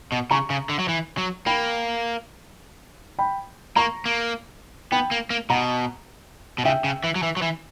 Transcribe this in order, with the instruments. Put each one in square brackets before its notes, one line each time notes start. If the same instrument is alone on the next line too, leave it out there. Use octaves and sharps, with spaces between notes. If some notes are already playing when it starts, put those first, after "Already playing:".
[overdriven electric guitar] B2
[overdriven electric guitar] C#3 [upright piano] A#5 C#6
[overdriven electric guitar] C#3
D3
F#3
E3
F#3
[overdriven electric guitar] A#3 [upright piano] G5 B5
[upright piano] G5 B5
[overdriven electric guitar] A#3 [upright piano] A#5 C#6
[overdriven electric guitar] A#3
[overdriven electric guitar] B3 [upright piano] G5 B5
[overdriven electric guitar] A#3
A#3
[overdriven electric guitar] B2 [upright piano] F#5 A#5
[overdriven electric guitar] B2
[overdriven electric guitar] C#3 [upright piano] E5 G5
[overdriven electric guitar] C#3
E3
F#3
E3
F#3
E3